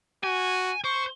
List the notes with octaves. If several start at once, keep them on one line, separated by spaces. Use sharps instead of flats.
F#4 G#5
C5 C#6